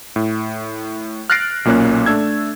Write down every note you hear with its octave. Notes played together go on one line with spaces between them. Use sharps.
A2
F6 F#6 A6 A#6 C7 D7
B1 A#2 A#3 C#4 F#6
A3 D4 E6 G#6